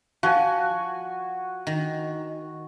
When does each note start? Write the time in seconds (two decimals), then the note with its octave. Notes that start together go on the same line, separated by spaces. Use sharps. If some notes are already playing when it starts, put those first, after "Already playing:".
0.23 F3 F#4 G#5
1.67 D#3